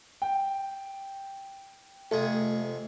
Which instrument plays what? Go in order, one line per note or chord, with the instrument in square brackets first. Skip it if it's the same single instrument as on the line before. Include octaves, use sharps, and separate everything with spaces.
[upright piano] G5
[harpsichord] F2 C3 G#4 [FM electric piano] A3